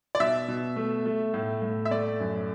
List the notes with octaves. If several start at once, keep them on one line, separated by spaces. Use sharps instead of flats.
D5
B2 E5
B2
A3
A3
A2
A2
E5
A3 D5
F#2